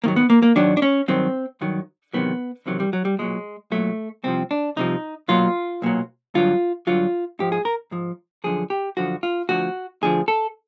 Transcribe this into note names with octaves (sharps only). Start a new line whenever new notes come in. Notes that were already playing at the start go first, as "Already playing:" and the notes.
G#2 D#3 F#3 A#3
B3
A#3
A#3
G#2 D#3 F#3 D4
D4
C#4
G2 D#3 F#3 C4
G2 D#3 F#3
E2 C3 D#3 F#3 B3
E2 C3 D#3 F#3
G3
F#3
G3
B1 A#2 F#3 G#3
B1 A#2 F#3 A3
C2 C3 F3 C4
D4
C2 C3 F3 D#4
B1 A#2 F#3 F4
B1 A#2 F#3
G2 D3 F#3 F4
G2 D3 F#3 F4
G#2 F3 G4
G#4
A#4
G#2 F3
F#2 D3 F3 G#4
G4
F#2 D3 F3 F#4
F4
D2 D3 F3 F#4
D2 D3 F3 G#4
A4